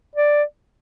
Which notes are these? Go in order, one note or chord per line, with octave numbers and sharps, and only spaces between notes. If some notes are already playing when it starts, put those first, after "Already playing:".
D5